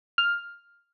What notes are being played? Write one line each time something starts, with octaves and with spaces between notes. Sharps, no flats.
F6